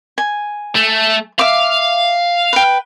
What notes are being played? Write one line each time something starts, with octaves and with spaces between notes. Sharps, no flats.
G#5
A3
E5 F5 D6
B4 G5